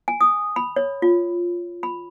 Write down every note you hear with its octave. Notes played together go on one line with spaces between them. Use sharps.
G#5
D#6
B5
C#5
F4
B5